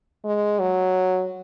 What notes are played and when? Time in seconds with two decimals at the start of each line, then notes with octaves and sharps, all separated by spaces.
0.25 G#3
0.59 F#3